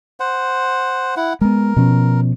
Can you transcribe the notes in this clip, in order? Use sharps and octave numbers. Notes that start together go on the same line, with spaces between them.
C5 F#5
E4 F#5
G#3 B3 A#4
B2 F3 C#4